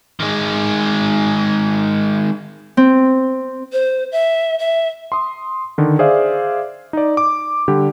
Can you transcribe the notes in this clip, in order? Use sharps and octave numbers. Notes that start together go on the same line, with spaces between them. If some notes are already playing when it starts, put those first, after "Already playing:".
D#3 G#3
C4
C5
E5
E5
C6 D#6
D3 D#3
G#4 C5 D5 E5 F5
D#4 D5
D6
D3 G3 G4